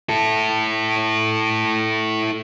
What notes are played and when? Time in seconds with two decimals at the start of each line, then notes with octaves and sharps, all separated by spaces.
0.09 E4 A4